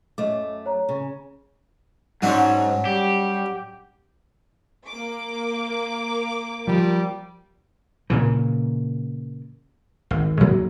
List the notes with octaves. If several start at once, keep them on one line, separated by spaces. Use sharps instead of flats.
F#2 A3 D#5 D6
C#5 A#5
C#3
G#2 F#3 C#4 D4
G3 G4
A#3 D6
F3 G3
A#2 C#3 E3
G#1
D2 G#2 F#3 A#3